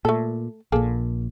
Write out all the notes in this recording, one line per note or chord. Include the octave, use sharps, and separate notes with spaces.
A#2 A3 A4
A#1 A#2 A#3 G#4 A4